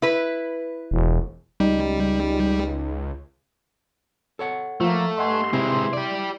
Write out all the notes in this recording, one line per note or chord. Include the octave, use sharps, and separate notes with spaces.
E4 B4
E1
C#2 G3 D#4
A4 C#5 F#5
F3 A3 A#3
G2 D#5 F#5 G#5 C6
C3 G#3 C4 E4
G4 D5